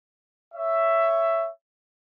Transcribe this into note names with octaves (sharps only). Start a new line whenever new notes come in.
C#5 E5